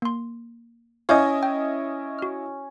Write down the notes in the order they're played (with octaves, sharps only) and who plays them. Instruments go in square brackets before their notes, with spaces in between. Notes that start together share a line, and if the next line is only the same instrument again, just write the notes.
[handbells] A#3 C6
[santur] C#4 [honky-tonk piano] E4 D#5 [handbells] F5 D6 G6
[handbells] G5
F#4 F6